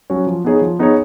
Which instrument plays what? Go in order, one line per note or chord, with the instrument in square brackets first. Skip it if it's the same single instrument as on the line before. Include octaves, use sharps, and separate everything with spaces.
[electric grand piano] F#3 C#4 F#4 C#5
F3
B3 D#4 G#4 C#5
F3
B3 D#4 G#4 C#5